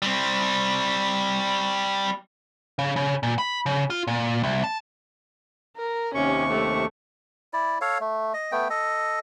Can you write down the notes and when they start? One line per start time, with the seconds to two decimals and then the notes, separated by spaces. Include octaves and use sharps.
0.02 G3 C4
2.79 C#3
2.96 C#3
3.23 A#2
3.38 B5
3.66 C#3
3.90 F4
4.07 A#2
4.43 C2
4.64 A5
5.77 A#4
6.15 D#2 C3 C#4 C#6
6.51 A3
7.53 E4 D5
7.81 A4 C#5 F5
8.00 A3
8.34 D#5
8.52 A3 B3 G5
8.70 A4 D#5